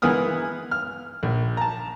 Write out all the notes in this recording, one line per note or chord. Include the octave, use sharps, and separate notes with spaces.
E3 G#3 B3 A#4 D#6 F6
F6
A#1
A5 A#5